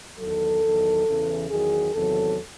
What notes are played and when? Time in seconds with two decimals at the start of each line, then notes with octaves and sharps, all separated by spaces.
0.18 E2 D#3 F#3 A4
0.63 E2 D#3 F#3
1.06 E2 C#3 E3
1.49 E2 D#3 F#3 G#4
1.94 E2 C3 D#3 F#3 A4